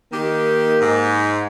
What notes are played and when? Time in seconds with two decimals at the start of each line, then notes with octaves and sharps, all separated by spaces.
0.13 D#3 A#3 G4
0.80 G#2